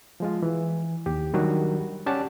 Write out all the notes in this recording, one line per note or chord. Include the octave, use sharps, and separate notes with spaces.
F3 G#3 F4
E3
D#2 G4
D#3 F#3 G3 D4 F#4
C#4 G4 D5 F#5 A5